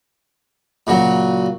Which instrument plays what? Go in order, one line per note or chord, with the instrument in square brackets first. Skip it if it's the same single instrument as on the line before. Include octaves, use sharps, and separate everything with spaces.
[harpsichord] A#2 C#3 F#3